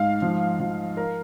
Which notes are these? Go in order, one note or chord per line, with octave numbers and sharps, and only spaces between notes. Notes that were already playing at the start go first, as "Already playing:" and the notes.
Already playing: G#2 F5
F3
F3
A#4